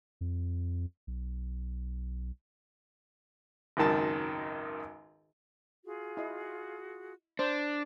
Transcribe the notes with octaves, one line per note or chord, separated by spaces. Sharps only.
F2
B1
G#1 C#2 F#2 D#3 A5
F4 F#4 G#4
E4 D#5
D4 C5